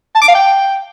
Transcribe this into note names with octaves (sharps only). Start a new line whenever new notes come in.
A5
D6
F5
G5